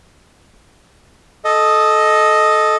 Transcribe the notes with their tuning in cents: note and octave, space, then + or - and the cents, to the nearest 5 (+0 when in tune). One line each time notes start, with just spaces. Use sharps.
A4 -15 D#5 +0